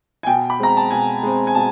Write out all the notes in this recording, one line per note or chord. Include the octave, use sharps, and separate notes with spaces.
G#5
B2 G5
B5
G#3 C4 A#5
A5
B2 G#5
G#3 C4
G#5
B2 A5